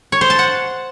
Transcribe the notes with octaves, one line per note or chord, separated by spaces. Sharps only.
C#5
C5
A5
F#5